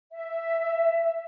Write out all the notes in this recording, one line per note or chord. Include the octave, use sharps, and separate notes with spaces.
E5